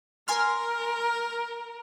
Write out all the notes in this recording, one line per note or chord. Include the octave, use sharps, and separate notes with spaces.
A#4 G#5 C6 F6